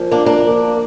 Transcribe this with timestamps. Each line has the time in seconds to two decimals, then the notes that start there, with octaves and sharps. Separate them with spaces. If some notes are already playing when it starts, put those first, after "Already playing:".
Already playing: A#2 F3
0.11 A#3 D4
0.26 A#3 D4